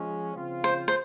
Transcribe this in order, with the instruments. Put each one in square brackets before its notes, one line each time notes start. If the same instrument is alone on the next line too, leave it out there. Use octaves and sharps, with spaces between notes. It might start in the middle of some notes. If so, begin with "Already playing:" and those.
Already playing: [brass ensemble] F3 G#3 C#4
C#3 F3 C4 F4
[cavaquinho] C5
C5